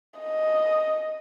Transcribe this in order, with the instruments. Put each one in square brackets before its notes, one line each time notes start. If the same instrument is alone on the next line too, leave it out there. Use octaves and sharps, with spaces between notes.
[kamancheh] D#5